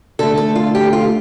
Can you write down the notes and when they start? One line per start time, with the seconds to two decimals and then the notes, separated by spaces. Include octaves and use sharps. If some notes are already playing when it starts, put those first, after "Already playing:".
0.19 D3 A3 A4
0.38 A4
0.55 F4
0.75 G4
0.93 F4